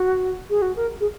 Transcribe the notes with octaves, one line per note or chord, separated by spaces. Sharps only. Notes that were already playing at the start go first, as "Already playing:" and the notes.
Already playing: F#4
G#4
F#4
A#4
G#4